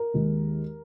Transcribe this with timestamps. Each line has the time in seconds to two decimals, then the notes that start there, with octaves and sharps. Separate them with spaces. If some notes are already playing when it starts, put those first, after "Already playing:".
Already playing: A#4
0.14 D#2 D#3 G#3